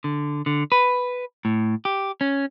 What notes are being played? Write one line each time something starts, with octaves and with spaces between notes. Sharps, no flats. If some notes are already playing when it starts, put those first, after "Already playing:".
D3
D3
B4
A2
G4
C#4